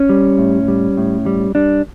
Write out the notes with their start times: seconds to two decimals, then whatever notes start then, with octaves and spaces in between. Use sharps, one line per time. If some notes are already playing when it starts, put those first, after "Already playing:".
Already playing: C#4
0.09 G3
0.39 A2
0.68 G3
0.97 A2
1.26 G3
1.55 G3 D4